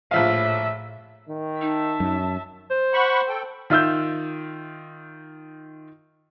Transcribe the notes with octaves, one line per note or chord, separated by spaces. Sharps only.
A#1 A2 F3 E5 F5
D#3
D#4 E5 A5
F#2
C5
F#5 B5 C#6
A4 G5
D#3 F4 E5 E6 G6